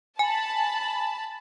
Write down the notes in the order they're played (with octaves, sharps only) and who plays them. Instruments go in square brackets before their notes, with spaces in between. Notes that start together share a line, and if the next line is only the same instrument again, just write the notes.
[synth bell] G#5 [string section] A5 B5